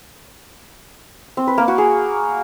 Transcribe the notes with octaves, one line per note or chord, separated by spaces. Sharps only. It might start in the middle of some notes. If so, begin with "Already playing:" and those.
C4
B4
A#3
F#4
G#4